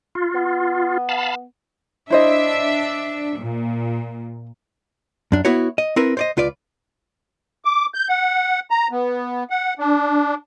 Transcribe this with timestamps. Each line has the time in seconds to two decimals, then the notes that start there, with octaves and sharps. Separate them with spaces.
0.15 F4
0.35 B3
1.09 F5 A5 B5
2.10 D4 E4 C5 D#5 E5
3.40 A#2
5.32 F#2 D4
5.45 B3 E4 F#4 C#5
5.78 D#5
5.96 C4 E4 A#4 B4
6.17 C5 D5 D#5
6.37 C#2 F4 B4 D5
7.65 D6
7.94 G6
8.09 F#5
8.71 A#5
8.91 B3
9.50 F#5
9.79 D4